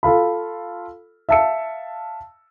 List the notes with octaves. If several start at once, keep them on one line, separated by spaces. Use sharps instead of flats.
F4 A4 F5 B5
E5 F5 A5 E6 C#7